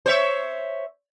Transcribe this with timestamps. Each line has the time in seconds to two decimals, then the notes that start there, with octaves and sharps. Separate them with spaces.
0.06 C5 C#5 E5